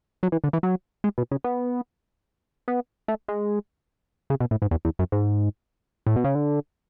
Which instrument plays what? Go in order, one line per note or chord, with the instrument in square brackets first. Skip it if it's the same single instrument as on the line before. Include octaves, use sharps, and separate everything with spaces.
[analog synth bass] F#3
E3
D3
E3
F#3
G#3
B2
C#3
B3
B3
A3
G#3
C#3
B2
A2
G#2
E2
E2
F#2
G#2
A2
B2
C#3
D3